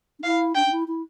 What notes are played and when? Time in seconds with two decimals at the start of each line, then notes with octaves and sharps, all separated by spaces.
0.19 D4
0.24 E4 F5
0.55 D4 G5
0.66 D4
0.71 E4
0.87 E4